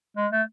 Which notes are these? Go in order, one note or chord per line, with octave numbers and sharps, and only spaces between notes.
G#3
A3